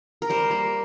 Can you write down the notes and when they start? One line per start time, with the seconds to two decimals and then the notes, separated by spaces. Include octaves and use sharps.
0.22 A#4
0.30 G3 C5
0.51 A#3